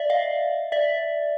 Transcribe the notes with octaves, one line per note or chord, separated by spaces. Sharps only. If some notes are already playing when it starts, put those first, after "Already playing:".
Already playing: D5 E5
D#5 F5
D5 E5